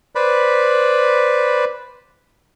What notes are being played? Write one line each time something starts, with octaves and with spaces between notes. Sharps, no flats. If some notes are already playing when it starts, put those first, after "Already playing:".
B4 C5 D5 B5